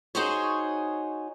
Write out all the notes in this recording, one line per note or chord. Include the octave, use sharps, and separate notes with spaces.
D#4 F#4 G#4 C5 C#5